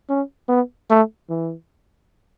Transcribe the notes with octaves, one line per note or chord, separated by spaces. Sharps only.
C#4
B3
A3
E3